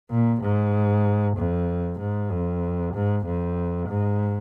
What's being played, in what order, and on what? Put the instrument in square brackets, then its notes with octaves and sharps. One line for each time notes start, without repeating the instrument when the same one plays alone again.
[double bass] A#2
G#2
F2
G#2
F2
G#2
F2
G#2